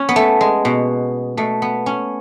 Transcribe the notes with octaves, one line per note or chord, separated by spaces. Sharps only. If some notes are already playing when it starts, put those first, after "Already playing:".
Already playing: C#4
B3
A3
G#3
B2
B2 A3
B3
C#4